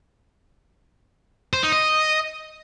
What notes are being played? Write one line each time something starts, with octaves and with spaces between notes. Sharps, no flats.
C5
D#4
D#5